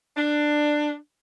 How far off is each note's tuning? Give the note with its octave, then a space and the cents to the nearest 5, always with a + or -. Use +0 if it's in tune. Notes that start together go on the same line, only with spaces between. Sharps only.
D4 +15